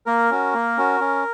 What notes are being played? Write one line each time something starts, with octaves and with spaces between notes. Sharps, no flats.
A#3 A#4
C#4 F#4
A#3
C#4 F#4
C#4